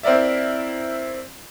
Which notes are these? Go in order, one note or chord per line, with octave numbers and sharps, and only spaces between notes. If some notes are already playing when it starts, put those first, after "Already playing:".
C4 E4 A#4 D5 E5